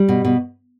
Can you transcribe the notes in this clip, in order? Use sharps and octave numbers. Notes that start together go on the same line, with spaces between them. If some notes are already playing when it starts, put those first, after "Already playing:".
Already playing: G3
B2
B2